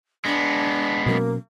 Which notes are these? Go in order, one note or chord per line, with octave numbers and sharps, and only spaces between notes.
G#3 B3 D4
B2 F#3 A#3 C#4